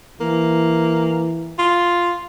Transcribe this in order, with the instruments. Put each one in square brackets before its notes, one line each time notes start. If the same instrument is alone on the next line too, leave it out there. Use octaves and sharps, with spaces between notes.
[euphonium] E3 [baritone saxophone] A#3
[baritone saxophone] F4